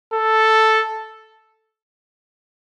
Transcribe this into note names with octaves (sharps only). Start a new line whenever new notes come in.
A4